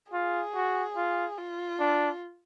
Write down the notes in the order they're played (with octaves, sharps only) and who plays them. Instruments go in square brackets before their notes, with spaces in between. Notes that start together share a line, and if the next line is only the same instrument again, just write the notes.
[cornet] F4 [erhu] G#4
[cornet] F#4
F4
[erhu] F4
[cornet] D4